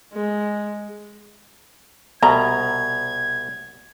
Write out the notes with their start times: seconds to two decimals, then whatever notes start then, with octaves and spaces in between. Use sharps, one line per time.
0.13 G#3
2.23 C2 B2 A#5 G#6